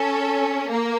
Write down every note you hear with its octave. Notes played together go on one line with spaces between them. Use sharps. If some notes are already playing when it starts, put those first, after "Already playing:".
Already playing: C#4 A4
A#3